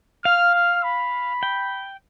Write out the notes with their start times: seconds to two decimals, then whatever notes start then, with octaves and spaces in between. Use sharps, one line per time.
0.24 F5 F6
0.54 F6
0.83 B5
1.43 G5